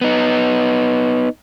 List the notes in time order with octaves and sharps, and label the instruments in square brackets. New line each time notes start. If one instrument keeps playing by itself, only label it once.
[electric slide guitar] B3 D#4